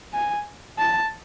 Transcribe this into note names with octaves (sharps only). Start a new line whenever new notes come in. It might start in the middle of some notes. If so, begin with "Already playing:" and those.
G#5
A5